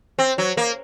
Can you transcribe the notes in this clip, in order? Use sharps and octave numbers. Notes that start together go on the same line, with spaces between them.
C4
F#3
A#3